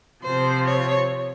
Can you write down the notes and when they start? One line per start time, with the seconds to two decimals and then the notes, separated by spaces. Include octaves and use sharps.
0.24 C3 F3 C5
0.66 C#5